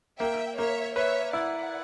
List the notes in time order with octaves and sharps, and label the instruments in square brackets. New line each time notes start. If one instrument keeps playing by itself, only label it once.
[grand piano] A#3 [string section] E5 G5
[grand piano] A#3 [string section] C#5 E5
[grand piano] B4 [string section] C#5 E5
[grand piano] E4 [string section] D5 F#5